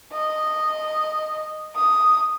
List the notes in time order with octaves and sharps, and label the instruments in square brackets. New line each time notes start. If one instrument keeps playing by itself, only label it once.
[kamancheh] D#5
D#6